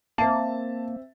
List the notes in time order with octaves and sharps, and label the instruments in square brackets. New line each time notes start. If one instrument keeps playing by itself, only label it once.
[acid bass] A#3 [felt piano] C4 E5 [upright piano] A5